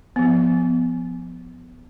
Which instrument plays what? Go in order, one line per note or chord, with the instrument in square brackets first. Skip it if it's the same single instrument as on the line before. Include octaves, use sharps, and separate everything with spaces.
[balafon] F3 B3